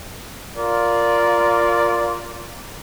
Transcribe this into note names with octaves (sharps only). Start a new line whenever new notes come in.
F4 A#4 D5